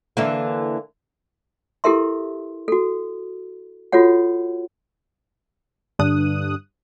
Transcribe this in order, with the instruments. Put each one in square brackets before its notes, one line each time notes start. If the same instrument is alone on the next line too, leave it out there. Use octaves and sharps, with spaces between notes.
[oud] D3 E3 A#3
[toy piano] E4 G4 A4 A#4 E5 C6
F#4 A4
F4 F#4 A4 C#5 F#5
[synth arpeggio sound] G2 D3 D4 D#6 F#6